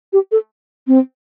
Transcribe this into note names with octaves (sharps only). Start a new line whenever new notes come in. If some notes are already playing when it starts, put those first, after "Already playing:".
G4
A4
C4